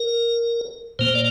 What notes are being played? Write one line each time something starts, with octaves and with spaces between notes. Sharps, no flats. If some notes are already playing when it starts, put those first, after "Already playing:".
Already playing: A#4
A#2 A#3 C5
D5